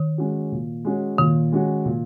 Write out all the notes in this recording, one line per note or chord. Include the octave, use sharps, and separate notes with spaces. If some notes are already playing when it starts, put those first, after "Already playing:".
Already playing: D#3
G#3 C#4 F#4
A#2
G#3 C#4 F#4
A#2 D#3
G#3 C#4 F#4
A#2